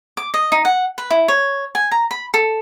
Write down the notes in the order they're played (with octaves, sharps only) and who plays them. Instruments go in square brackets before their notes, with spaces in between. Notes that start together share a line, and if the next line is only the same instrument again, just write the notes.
[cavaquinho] D6
D#5
D#4
F#5
B4
E4
C#5
G#5
A#5
B5
A4